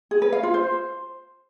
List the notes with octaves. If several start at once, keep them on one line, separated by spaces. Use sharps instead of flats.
G#4
B4
F5
F4
C5